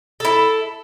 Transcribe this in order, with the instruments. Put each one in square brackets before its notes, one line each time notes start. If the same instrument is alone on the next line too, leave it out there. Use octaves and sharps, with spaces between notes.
[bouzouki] E4 A4